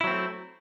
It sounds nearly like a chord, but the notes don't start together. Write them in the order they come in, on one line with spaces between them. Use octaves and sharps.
E4 F#3 C4 A#3 A3